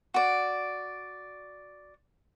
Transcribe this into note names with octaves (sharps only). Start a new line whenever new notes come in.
F#4 D5